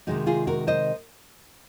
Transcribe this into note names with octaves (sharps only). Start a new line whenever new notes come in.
C3 D#3 G#3 D#4 F#4
F4 G#4
F#4 A#4
C5 D#5